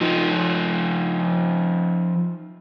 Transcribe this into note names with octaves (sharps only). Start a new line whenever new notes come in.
F3 D#4